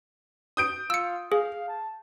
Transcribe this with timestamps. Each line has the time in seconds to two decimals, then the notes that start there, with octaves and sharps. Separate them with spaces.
0.57 D#6 G6 D7
0.90 F4 E6 C#7
1.32 G#4 F5
1.68 A5